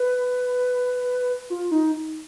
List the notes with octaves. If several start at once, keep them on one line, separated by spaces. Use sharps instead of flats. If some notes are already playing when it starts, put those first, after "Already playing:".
Already playing: B4
F4
D#4